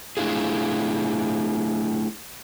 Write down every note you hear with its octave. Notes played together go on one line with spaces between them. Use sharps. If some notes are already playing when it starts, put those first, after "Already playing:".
A3 D4 E4 F4 G#4